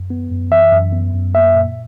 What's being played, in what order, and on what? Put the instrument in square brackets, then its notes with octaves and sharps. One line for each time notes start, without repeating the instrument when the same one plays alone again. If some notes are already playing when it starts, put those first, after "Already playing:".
Already playing: [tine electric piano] F#2
B3
F#2
E3 E5
F#2
B3
F#2
A#3 E5
A#2